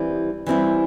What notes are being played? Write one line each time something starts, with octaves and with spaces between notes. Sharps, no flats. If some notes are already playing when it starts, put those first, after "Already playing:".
Already playing: E3 G3 C4 E4
E3 G3 C4 E4